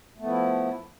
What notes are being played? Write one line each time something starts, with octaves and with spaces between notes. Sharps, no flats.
F3 A3 B3 E4